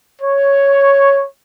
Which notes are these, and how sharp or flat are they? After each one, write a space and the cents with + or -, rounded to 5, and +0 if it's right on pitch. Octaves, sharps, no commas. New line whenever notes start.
C#5 +0